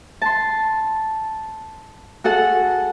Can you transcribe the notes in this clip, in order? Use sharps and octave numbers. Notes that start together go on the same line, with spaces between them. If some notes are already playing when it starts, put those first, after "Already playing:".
A5 C6
F#4 G#4 A4 F#5